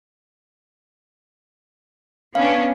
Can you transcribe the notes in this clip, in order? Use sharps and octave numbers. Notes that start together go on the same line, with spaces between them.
B3 C#4 D4 F5